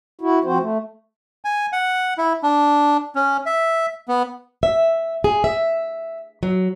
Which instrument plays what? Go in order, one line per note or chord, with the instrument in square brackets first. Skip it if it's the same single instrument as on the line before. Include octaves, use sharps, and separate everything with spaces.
[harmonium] E4 F#4
F3 C4 F#4 C5
A3
[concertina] G#5
F#5
E4
D4
C#4
E5
B3
[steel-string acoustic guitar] E5
G#4
E5
F#3